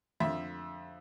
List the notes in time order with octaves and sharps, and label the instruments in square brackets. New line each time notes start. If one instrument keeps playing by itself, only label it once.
[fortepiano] F2 D3 E5